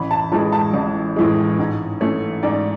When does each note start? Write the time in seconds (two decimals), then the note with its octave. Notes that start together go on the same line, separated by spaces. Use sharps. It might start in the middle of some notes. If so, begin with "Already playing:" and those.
Already playing: A1 B5
0.11 A5
0.32 A2 E3 G#3 A5
0.52 A5
0.74 A1
1.16 A2 E3 G#3
1.59 G#2
2.00 E3 A3 C#4
2.43 G#2 D5